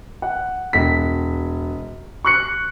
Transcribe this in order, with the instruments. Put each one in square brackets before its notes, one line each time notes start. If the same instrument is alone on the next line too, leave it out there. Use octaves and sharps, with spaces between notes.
[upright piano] F#5
E1 B6
C#6 F#6 C#7